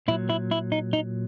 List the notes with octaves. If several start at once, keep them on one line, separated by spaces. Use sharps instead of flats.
A#2 F#3 E4
E4
E4
D#4
D#4